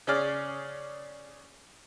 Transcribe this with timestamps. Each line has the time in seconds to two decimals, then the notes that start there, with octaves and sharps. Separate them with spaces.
0.07 C#3 C#4 G#4 D5 F6